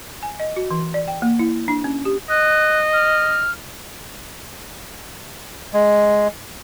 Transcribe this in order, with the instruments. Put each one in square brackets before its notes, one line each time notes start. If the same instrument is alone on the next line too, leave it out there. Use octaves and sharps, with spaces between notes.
[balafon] G#5
D#5
F#4
E3
D5
G5
A#3
E4
D4
C#4
G4
[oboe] D#5 [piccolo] F#6
[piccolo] F6
[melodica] G#3